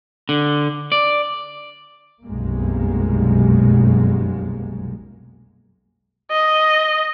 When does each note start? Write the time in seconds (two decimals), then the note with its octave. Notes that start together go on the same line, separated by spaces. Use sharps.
0.29 D3
0.92 D5
2.25 F1 B1 F#2 G3 G#3 A#3
6.31 D#5